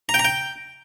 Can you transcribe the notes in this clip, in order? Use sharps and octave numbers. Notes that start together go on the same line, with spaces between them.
A#5
G5
A#5
G5